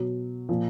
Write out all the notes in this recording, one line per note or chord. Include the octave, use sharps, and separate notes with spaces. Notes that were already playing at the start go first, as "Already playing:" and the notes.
Already playing: B2 F#3
A#2 F3